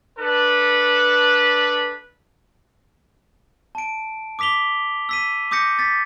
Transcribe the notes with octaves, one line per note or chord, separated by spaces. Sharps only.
D4 A4 B4
A5 D7
D6 D#6 B6 F7 G7
E6 B6 D#7
D6 D#6 G6 A#6 C#7
A6 B6